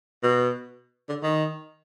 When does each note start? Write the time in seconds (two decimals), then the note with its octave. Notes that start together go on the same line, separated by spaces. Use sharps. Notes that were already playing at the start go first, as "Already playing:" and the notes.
0.23 B2
1.09 D3
1.23 D#3